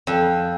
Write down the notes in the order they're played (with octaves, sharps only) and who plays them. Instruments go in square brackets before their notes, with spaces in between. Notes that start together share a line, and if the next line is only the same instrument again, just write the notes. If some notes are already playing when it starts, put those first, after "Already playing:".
[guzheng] F2